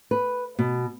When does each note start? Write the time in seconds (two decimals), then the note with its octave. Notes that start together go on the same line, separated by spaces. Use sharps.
0.11 B4
0.59 B2